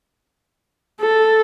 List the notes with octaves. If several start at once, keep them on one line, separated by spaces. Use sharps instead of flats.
A4